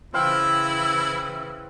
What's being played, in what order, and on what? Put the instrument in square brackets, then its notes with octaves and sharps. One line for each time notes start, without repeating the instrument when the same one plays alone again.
[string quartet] C#3 E3 [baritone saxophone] E4 [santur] C5 F5 G5 [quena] E6